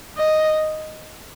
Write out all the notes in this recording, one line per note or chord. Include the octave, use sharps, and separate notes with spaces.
D#5